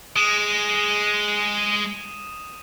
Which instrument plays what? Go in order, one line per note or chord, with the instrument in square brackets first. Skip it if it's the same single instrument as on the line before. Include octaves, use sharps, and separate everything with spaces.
[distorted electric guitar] G#3 [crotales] D#6 D#7 E7